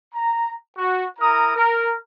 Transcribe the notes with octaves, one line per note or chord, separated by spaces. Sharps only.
A#5
F#4
E4 A#4 A#5 D#6
A#4